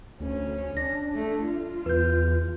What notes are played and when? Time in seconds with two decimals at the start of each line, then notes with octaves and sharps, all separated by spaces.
0.20 D2 C#4
0.77 D4 A#6
1.14 A3
1.43 F4
1.86 E2 B4 G6